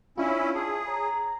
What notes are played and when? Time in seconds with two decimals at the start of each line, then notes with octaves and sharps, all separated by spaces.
0.18 C#4 D4 E4 F4
0.55 G#4 A5
0.88 C#5 A#5